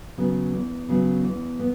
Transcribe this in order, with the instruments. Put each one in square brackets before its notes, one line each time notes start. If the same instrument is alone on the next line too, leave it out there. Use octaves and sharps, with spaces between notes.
[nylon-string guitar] C#3 F#3 B3
E2
C#3 F#3 B3
E2
B3